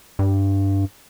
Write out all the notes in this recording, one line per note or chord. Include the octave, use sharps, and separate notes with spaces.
G2